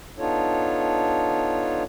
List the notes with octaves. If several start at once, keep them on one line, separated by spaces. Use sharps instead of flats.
B3 D4 D#4 F4 A4 C#5